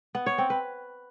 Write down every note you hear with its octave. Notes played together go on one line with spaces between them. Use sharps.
B3
C#5
C4
B4